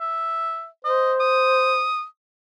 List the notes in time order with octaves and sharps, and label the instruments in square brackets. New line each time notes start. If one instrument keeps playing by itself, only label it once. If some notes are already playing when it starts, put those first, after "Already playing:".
[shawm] E5
[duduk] C5 [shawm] D#5
[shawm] D#6